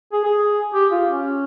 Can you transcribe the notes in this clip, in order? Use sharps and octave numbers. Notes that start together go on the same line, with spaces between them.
G#4
G#4
G4
F4
C#4